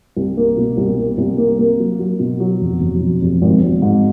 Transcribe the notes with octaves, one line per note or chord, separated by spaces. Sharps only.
C2
A#3
B2
C2
A#3
C2
A#3
A#3
F#3
F#3
B2
F#3
F1
F1
B2
F1
G#1
G#1
G#2